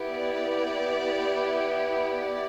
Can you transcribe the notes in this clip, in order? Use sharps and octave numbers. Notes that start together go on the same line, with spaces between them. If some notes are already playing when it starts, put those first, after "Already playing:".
Already playing: B3 E4 G4
D5
D5